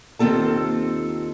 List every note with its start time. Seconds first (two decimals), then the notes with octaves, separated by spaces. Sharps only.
0.19 D#2 D#3 C4 F4 A4 A5